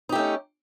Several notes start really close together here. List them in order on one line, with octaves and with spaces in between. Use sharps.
D#4 G4 A3 C#4